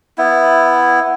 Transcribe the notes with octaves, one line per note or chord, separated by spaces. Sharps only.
B3 E4